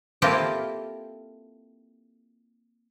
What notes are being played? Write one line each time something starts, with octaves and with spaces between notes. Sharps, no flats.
A#3 C4 E4 F4 G4 A4